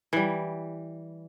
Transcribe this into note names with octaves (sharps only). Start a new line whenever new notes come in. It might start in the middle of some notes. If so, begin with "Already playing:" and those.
E3 G3